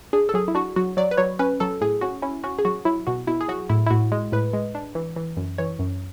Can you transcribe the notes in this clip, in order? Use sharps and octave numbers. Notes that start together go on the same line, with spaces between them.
D4 G#4
A4
F#3 G#4
E4
D4 F#4
F#3 F#4
F#3 D5
B4
F#3 C#5
C#4 B4
F#3 A4
A2 G#4
C#4 F#4
C#4 E4
C#4 F#4
G#4
F#3 F#4
F#3 E4
B2 F#4
B2 E4
G#4
F#3 F#4
A2 E4
E4
A2 F#4
G#3
A2 B4
G#3
D4
E3
E3
F#2
E3 C#5
F#2